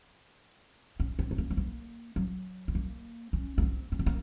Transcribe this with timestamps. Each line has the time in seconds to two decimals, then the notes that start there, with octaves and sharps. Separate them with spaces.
1.00 C#4
1.19 C4
1.31 A3
1.38 A#3
1.50 A3
1.57 A#3
2.16 F#3
2.68 C4
2.75 A#3
3.33 C#4
3.58 A#3
3.62 C4
3.92 C#4
3.99 C4
4.06 A#3